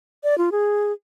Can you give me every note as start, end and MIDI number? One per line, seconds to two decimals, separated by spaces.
0.24 0.37 74
0.38 0.50 65
0.52 0.92 68